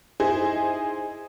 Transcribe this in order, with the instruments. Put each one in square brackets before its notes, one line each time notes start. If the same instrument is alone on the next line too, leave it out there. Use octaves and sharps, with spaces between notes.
[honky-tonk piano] D#4 E4 G#4 C5 D#5